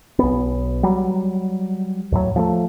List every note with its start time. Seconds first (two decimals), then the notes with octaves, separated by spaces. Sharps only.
0.19 B1 B3
0.83 F#3 G3
2.12 D#2 A2 F#3
2.36 F3 G#3 A3